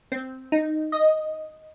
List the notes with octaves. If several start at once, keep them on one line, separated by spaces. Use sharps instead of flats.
C4
D#4
D#5